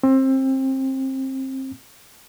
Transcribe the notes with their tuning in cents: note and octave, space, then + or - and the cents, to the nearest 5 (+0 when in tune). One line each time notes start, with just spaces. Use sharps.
C4 +25